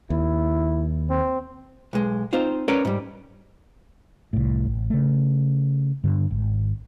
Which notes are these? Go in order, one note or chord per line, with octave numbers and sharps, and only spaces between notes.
D#2 E4
C4
B1 G#3
C4 D#4 F4 C5
C#4 A#4 B4 C#5 D5
G#2 G3
C2 A2
A1
C#3 A3
G2 D3
G#1